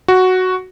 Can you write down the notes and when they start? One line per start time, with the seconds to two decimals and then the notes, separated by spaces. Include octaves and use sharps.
0.08 F#4